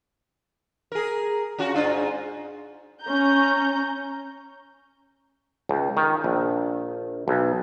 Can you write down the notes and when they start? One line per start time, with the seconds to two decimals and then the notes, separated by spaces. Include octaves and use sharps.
0.92 G#4 A#4
1.58 C#4 F4 F#4
1.74 G#2 D4 F4
3.03 C#4 A#5 G6
5.69 C#2
5.97 D#3
6.24 A#1
7.28 B1